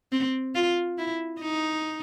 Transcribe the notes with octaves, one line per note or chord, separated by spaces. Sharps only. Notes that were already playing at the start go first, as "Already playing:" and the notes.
C4
F4
E4
D#4